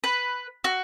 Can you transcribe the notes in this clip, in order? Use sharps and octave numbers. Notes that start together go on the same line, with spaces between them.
B4
F#4